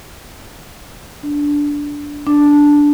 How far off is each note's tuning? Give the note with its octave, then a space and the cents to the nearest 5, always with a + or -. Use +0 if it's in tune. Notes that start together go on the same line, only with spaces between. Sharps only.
D4 -10
D4 -5